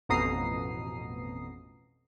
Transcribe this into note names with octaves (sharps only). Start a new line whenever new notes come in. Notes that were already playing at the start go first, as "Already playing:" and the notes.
A1 F2 B2 A#5 D#6 C7